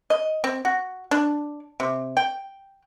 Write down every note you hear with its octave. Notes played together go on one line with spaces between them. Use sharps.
D#5
C4
F#4
D4
C3
G5